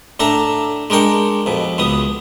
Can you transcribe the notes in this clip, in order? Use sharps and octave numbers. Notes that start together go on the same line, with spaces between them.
A2 D4 A4 A#5
G#3 D4 A#4 G5 C#6
F2 B2
C#2 B3 D#6